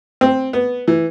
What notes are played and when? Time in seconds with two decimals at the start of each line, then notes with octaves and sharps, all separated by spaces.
0.21 C4
0.53 B3
0.88 E3